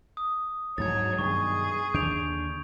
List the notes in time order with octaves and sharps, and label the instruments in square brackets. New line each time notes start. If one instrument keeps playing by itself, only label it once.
[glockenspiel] D#6
[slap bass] D2 G#2 [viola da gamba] F#3 C#5 [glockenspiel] G#6 A6
[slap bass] G2 B2 D#3 [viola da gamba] G#4 [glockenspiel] C#6
[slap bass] D#2 D3 D4 [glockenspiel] G6 D7 F7